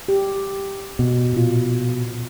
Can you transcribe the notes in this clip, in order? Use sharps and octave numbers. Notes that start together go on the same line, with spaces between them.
G4
B2
A#2 F4